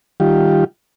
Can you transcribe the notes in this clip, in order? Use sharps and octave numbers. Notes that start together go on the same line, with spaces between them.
D#3 G3 F4 G4